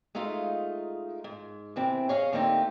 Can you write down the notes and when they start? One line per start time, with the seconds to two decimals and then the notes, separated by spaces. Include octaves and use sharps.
0.15 G#3 A3 D#4 F4 F5
1.24 G#2
1.76 C3 E3 C4
2.09 G#4 C#5 D#5 F5
2.33 D3 A3 A#3 C4 D#4 G4